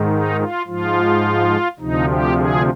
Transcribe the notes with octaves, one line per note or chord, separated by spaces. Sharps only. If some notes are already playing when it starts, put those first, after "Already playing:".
Already playing: G#2 D#3
D#4
F4
G#2 F3 F4
D2 C3 F3 D#4
G4
G#4